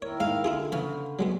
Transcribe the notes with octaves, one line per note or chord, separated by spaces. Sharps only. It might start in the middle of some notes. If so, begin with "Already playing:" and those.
D#3 E4 A#4 C#5
G#2 F5
D3 E4 F4 G#4
C#3 E3
F#3 G#3 B3